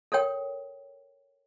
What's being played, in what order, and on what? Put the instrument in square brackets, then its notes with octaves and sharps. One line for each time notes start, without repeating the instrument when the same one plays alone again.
[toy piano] A4 A#4 C#5 G5